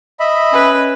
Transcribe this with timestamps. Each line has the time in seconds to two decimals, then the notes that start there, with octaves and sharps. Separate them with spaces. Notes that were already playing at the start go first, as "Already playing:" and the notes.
0.20 D#5 E5 B5
0.51 C#4 B4